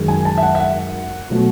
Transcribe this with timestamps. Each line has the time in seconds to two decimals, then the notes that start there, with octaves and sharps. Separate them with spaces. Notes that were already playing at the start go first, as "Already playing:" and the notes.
Already playing: F#2 D#3 G#3
0.08 G#5
0.25 A5
0.38 E5
0.43 F#5
0.55 E5
0.60 F#5
1.30 B2 F#3 A3